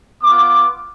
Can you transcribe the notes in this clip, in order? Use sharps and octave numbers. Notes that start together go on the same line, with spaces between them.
B3 F4 D6